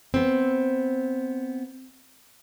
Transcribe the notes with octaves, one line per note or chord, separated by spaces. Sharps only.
B3 C4